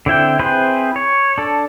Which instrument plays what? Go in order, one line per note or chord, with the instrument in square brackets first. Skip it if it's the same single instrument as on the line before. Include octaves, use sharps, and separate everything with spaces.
[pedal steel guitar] D3 C4 E4 G5
C4 E4 G#4 B4 C5
C#5
D4 A4